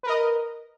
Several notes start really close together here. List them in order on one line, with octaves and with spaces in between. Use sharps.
B4 A#4 D#5